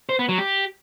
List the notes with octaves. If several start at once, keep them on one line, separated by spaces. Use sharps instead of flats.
C5
B3
F#3
G4